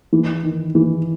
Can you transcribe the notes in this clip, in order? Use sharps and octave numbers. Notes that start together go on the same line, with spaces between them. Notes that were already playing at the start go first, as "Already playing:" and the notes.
E3
D#3
E3